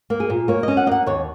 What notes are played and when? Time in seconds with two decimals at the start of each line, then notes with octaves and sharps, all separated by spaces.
0.10 A#3
0.20 G#4
0.30 A#2
0.48 A#3 C#5
0.63 C#4 D#5
0.77 F#5
0.87 A#3 D#5
0.92 F#5
1.07 D#2 C#5